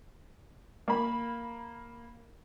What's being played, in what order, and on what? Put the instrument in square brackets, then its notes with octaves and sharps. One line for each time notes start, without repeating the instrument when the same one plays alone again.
[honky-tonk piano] A#3 B5